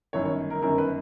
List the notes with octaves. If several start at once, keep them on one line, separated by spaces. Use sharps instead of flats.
G1 F#2 D#3 C#5
C#5
A#4
G1 F#2 D#3 A#4
B4